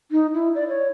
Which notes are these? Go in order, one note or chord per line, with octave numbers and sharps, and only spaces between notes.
D#4
E4
D5
C#5